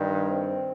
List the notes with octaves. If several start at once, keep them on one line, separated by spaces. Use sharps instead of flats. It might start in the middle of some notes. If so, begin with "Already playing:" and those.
Already playing: G2 D#3
C4